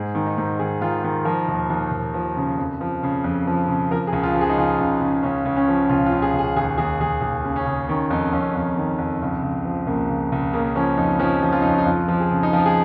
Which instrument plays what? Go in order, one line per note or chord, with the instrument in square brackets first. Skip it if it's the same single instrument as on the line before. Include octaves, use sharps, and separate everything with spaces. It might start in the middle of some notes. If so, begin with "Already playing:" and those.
Already playing: [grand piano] G#2 G#4
D#3
D#4
G#2
D#3 G#4
D#3 F4
D#3 F4
F3 A#4
D#2
D#2
D#2
F3
C#3
F2
F3
C#3
F2
F3
C#3
F3 A#4
G#4
C#2
F4
F3
G#4
D#4
C#3 F4
C#2
C#3
C#2 C#4
C#2
C#4
F3
C#2 F4
F4
C#2
G#4
C#2
G#4
D#2 G#4
D#2 G#4
D#2 G#4
D#2
C#3
C#4
C#3
D#3 C#4
F2 D#4
F2 C#4
F2
D#3
F2
C#2
C#2
F3
C#2 A#3
C#3
C#2
C#3 A#3
F3 C#4
F2 D#4
F3 C#4
F3
F4
F2 D#4
C#4
D#4
F2 F4
F3
G#4
C#3
D#4
F3 F4
G#4